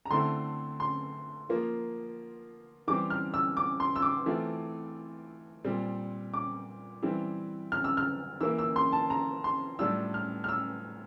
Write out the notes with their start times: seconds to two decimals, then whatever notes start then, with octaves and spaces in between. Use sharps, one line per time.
0.05 A#5
0.11 D3 A3 C4 E4 C6
0.80 C6
1.49 F3 A#3 F4
2.88 E3 G3 C4 D6
3.10 F6
3.34 E6
3.57 D6
3.80 C6
3.96 E6
4.02 D6
4.26 E3 A3 C4 F4
5.64 A#2 G3 C4
6.34 D6
7.02 E3 G3 C4 E4
7.72 F6
7.84 E6
7.97 F6
8.41 E3 A#3 E4 E6
8.58 E6
8.76 C6
8.92 A5
9.10 A#5
9.44 C6
9.79 A2 G3 D4 F4 E6
10.14 F6
10.44 F6
10.48 E6